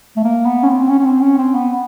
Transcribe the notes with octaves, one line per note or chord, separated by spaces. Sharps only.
A3
A#3
B3
C#4
C4
C#4
C#4
C4
C#4
C4
B3